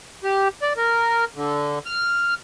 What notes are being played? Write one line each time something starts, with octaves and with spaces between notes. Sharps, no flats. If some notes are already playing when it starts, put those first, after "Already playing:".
G4
D5
A#4
D3
F6